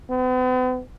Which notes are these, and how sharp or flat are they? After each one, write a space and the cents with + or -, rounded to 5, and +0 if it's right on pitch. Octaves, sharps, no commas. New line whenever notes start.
B3 +45